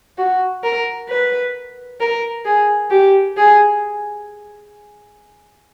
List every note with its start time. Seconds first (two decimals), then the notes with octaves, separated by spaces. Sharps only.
0.18 F#4
0.64 A#4
1.09 B4
2.00 A#4
2.45 G#4
2.90 G4
3.37 G#4